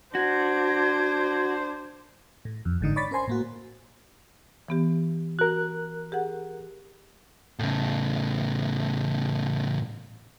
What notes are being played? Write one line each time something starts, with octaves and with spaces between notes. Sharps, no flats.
D4 F#4 C5 G#6
A2
F2
G1 G#2 D3 D#4
C#5 D5 B5 A6 B6
C#4 A#4 C5 G#5 C6
A2 A#3 F#4
E3 B3 G4
F#4 A#4 F#6
G4 G#4 F#5
A2 C#3